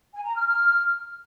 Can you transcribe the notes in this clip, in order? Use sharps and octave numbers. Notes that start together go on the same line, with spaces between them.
G#5
A#5
F6
F6